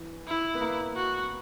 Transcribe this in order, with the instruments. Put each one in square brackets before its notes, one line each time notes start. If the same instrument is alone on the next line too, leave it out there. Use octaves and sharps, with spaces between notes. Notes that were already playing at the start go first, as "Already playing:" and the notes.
Already playing: [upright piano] E3
[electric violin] E4
[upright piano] B3
A#3
[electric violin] F#4